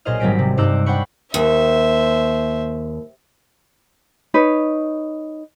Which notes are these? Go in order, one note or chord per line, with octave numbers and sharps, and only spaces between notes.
B1 A#2 G#4 C5 D#5 F6
G#1 F#3 G3 C4 B6 D7
C3
G2 D#4 C5 D6 E6 F#6
D4 C5 F#5 G5 B5 C#6
D#2 C5 E5
D#4 B4 C#5